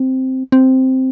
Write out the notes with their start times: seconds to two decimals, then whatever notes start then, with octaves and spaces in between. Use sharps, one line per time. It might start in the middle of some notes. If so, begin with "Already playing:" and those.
Already playing: C4
0.52 C4